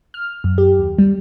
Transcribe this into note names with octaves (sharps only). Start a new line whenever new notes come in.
F6
F#2
G4
D#2
G3